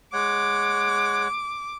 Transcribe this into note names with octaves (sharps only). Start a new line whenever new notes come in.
G#3 C#5 F#5 D6